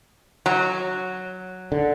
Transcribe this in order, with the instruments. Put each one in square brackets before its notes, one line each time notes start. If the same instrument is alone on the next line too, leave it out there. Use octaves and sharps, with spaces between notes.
[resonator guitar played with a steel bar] F#3
[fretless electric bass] D3